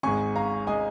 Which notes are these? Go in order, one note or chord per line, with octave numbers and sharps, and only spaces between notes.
G#1 G#2 G#3 G#5 C#6
F5 A#5
G#3 D#5 G#5